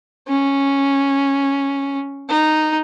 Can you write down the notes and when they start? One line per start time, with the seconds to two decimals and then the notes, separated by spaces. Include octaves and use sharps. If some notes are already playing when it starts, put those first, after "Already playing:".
0.28 C#4
2.29 D#4